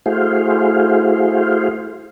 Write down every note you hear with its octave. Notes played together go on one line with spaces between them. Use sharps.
A3 E4 F#4 G#4 C5 F5